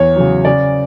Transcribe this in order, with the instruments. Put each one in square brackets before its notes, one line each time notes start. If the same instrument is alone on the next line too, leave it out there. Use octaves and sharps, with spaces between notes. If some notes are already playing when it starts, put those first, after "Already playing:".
Already playing: [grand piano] E2 C#5
C#3 F#3
C#3 D5